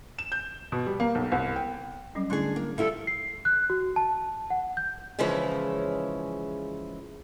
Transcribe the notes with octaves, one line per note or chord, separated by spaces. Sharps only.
E7
G6
B2
G3
A#3
B1
C2
G5
F#3 G3 C#4
D3 A3 D4 E4 G#4
A#3
G3 E4 F4 A4 E5
C7
F#6
F#4
A5
F#5
G6
C#3 E3 F3 G#3 C#4 E4